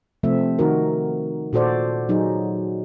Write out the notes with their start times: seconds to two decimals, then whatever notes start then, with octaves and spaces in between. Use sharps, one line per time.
0.23 C3 F3 A3 C4 E5
0.59 D#3 D#4 F#4 A#4
1.53 A#2 F#4 A4 C5 D5
2.09 F#3 D#4 G#4